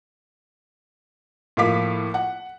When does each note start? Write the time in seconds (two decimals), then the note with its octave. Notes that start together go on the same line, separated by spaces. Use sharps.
1.57 A2 F3 A#3 F5 D6 B6
2.14 F#5